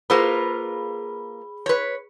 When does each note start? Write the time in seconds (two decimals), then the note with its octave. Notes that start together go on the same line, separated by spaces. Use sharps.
0.10 A#3 F4 G#4 B4 B5
1.66 B4 C#5